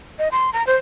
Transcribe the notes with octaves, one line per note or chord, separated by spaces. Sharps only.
D#5
C6
A#5
C5